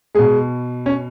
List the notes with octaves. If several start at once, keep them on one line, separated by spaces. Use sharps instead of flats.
B2 G#3 G#4
C#4 C#5